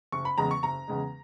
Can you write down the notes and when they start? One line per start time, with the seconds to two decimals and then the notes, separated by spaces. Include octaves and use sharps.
0.12 F#1 C#6
0.25 B5
0.38 E2 C#3 G#3 A#5
0.51 C#6
0.63 F#1 A#5
0.88 E2 C#3 G#3